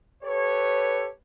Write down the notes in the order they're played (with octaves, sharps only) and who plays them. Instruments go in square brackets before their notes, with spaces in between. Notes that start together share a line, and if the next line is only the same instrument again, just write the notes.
[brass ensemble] G4 A4 B4 C#5